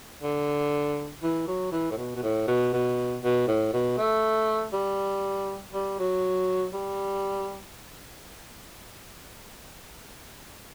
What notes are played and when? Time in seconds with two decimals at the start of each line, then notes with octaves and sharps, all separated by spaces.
0.22 D3
1.23 E3
1.47 F#3
1.72 E3
1.91 A2
1.97 B2
2.15 B2
2.23 A2
2.47 B2
2.73 B2
3.23 B2
3.48 A2
3.73 B2
3.98 A3
4.73 G3
5.73 G3
5.99 F#3
6.73 G3